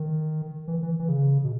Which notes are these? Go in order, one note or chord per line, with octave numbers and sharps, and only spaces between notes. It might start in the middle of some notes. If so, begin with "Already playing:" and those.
Already playing: D#3
E3
E3
E3
C#3
B2